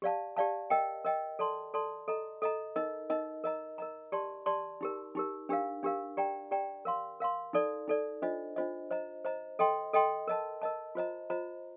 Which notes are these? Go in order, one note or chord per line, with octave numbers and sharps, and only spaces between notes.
G4 D5 F5 A5
G4 D5 F5 A5
A#4 D#5 G5
A#4 D#5 G5
A4 D5 A5 C6
A4 D5 A5 C6
A4 D#5 A#5
A4 D#5 A#5
D#4 A#4 D#5
D#4 A#4 D#5
A#4 D#5 A#5
A#4 D#5 A#5
G4 D5 A5 C6
G4 D5 A5 C6
D#4 G4 A#4
D#4 G4 A#4
D4 G4 A#4 F5
D4 G4 A#4 F5
G4 D5 G5 A#5
G4 D5 G5 A#5
A#4 F5 C6
A#4 F5 C6
D#4 A4 D5
D#4 A4 D5
D4 F4 C5 D#5
D4 F4 C5 D#5
C5 D#5 A#5
C5 D#5 A#5
A4 D#5 G5 C6
A4 D#5 G5 C6
A#4 D#5 A5
A#4 D#5 A5
F4 C5 D#5 A#5
F4 C5 D#5 A#5